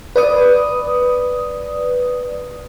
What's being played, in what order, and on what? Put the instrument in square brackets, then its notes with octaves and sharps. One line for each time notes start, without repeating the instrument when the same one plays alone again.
[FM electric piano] B4 D5 D#6